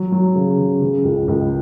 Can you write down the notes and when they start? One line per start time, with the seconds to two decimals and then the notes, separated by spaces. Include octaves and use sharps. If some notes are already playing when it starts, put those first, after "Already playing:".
Already playing: F#3
0.12 F#3
0.35 C#3
0.58 C#3
0.81 C#3
1.04 C#2
1.28 C#2